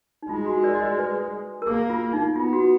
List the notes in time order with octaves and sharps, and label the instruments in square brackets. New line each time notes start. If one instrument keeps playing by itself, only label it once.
[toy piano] D#4
[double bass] G#3 [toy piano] F4
[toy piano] F#4
A#4 D5
D#5
A#4 D5
B4
A#4
[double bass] A#3 [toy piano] G#4
[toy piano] F4
D#4
[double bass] B3 [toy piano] F4
[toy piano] F#4